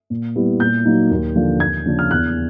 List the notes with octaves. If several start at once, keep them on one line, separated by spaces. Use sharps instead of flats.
A#2
G3 B3 E4
A#2 G6
F#3 A#3 D#4
D#2
D3 F3 A#3
D#2 G#6
C#3 F3 A#3 D4
F6
E2 F#6